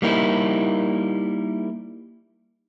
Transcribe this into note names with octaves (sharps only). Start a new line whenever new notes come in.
G3 A#3 D#4 E4